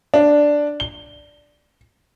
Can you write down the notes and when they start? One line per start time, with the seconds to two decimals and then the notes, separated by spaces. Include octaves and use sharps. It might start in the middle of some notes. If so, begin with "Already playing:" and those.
0.14 D4
0.80 G7